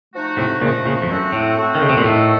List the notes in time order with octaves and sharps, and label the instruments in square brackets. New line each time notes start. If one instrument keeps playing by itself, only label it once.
[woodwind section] F3 A3 D#4 F#4
[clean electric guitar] A2 C3
[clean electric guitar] A#2 C#3 [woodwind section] F3 A3 D#4 F#4
[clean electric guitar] A#2 C#3
F2
[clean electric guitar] F#2 [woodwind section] A3 C4 F#4
[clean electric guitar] A2
[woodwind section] A3 C4 F#4
[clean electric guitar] D#3
C#3
C3
A#2
[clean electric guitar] A2 [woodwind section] D#3 A3 D#4 F#4 A4